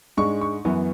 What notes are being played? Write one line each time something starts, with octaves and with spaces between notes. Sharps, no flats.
G#2 G#3 D4 C#6
C#6
F#2 E3 B3